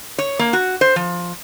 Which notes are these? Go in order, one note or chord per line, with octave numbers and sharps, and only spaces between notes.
C#5
A#3
F#4
C5
F3